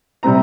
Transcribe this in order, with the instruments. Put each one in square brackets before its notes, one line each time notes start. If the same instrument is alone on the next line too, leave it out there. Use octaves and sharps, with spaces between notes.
[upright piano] C3 G3 C4 A#5